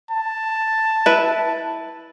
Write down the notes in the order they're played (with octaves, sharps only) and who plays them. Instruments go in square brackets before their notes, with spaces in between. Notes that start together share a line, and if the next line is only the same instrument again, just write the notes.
[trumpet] A5
[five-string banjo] E4 B4